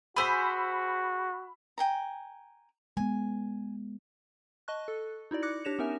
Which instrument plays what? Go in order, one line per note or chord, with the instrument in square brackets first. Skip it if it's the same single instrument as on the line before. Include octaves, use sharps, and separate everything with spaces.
[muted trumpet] F#4 [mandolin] G#4 C5 [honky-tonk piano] B5 E6 B6
[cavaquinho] G5 G#5 A#5
[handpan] G#3 B3 [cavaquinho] G#5
[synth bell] D#5 A5 C#6 F#6
A4
D#4 E4 F#4 D5
D6 F#6 A#6 C#7
D4 G4 C#5 A#6 E7 F7
B3 C#4 D#4 A#4 E5 G#5